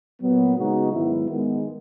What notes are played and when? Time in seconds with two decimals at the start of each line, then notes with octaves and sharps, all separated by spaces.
0.21 A#2 F#3 B3
0.57 C#3 G#3 B3 D#4 F#4
0.92 G#2 D#3 F#3 B3 E4
1.29 D#3 G#3 B3